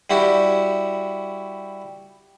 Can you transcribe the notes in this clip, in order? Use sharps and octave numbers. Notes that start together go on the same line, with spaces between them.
G3 E4 F#4 G4